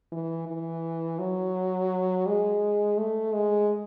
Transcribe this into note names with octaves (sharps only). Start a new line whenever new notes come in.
E3
E3
F#3
G#3
A3
G#3